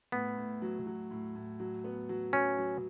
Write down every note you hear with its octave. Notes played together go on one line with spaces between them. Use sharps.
A2 B3
A2
F#3
F#3
A2
A2
F#3
B3
F#3
F#3 C#4
F#3